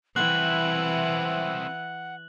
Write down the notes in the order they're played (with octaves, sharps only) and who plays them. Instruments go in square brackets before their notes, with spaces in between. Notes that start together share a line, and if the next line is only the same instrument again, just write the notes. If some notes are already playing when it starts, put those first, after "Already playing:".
[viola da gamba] E3 [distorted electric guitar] C4 E4 [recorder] F#5 [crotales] F#6 F#7